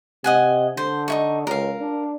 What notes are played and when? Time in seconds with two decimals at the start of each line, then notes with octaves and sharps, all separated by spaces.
0.24 C3 D#5 F#5 G#5
0.77 D3 C5
1.08 D#4 E4 C#6
1.47 C#2 A#4 F5
1.81 D4